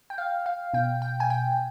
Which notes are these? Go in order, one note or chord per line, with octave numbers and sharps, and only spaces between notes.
G5
F5
F5
B2 G5
G5
G#5
G5